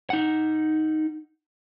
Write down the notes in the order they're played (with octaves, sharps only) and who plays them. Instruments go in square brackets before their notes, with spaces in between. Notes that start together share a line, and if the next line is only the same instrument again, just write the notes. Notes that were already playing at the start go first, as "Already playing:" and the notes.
[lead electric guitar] D#4 F#5